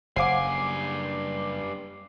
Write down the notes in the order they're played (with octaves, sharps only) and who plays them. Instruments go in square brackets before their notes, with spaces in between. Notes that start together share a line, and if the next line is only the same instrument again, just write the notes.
[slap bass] F#1 [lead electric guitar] G2 G#5 [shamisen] C5 F5 F#5 [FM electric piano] D6 C7